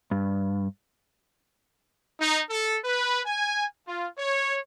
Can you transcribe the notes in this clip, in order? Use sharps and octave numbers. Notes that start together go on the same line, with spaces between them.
G2
D#4
A4
B4
G#5
F4
C#5